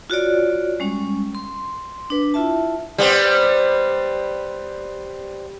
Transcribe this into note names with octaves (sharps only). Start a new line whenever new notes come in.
F4 F#4 C#5 D5
G3 G#3 C#4
C6
D4 B4
E4 F4 E5 A5
G3 B3 C4